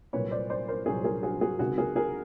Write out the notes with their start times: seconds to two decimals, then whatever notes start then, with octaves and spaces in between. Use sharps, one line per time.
0.13 C2 A#2 F#3 B4 C#5
0.31 C5 D5
0.50 C5 D5
0.68 A#4 C5
0.86 C2 A#2 F#3 G#4 A#4
1.04 G#4 A#4
1.23 F#4 G#4
1.41 F#4 G#4
1.59 C#2 C3 D#3 F#4 G#4
1.78 G#4 A#4
1.96 G#4 A#4